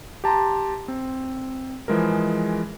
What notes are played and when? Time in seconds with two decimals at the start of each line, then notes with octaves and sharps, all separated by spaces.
0.24 G4 A5 A#5 C6
0.88 C4
1.88 E3 F3 G#3 G#4 A#4